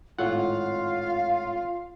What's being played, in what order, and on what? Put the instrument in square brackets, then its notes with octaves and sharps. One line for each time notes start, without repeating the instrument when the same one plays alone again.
[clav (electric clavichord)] G#1 A2 [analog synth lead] F4 [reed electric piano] C#5 F#5 [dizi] F5